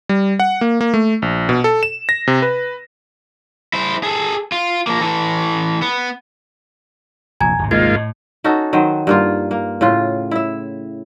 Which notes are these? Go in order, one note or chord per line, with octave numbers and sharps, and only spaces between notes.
G3
F#5
A#3
A#3
A3
A#1
B2
A4
E7
A#6
C3
B4
E4 C5
G#4 A4
F4
F3 A#3
E3 A4
B3
F1 A#1 G#5 A#5 G#6
D1 G#1 C3
G#2 A#3 F4 D#5 G#6
A2
C#4 D#4 F#4 A4
D#3 F#3 C5
G2 A#3 F4
A#3
A2 C#3 F4
E4 E5